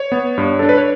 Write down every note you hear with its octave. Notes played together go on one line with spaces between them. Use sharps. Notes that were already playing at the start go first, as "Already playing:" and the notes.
Already playing: C#5
B3
G2
D4 A4
B4
C#5